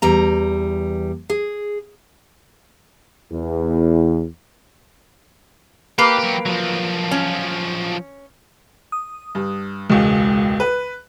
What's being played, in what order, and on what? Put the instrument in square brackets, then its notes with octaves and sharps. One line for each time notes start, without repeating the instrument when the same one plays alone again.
[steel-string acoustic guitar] E2 G3 A#5
G#4
[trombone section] E2
[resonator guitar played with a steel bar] A#3 B4 [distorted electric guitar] G4
[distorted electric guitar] F#3 G4
F3 F#3
[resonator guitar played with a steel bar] C#4
[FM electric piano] D#6
[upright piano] G2
[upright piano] E1 C#2 [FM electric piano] G#3
[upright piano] B4